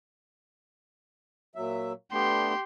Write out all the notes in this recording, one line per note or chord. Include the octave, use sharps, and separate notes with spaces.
A#2 F#3 E5
A3 B3 D4 G4 C6